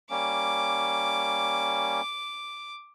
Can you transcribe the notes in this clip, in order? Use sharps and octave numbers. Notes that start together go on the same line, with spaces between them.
G3 A#3 C#4 D6